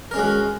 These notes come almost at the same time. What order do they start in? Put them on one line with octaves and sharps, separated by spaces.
A#4 C#4 G#3 F#4